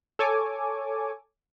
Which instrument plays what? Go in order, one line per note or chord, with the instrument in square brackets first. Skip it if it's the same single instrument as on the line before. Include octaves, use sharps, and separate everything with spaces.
[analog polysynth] A4 C#5 G#5 D6